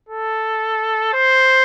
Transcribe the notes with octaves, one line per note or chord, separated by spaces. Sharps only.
A4
C5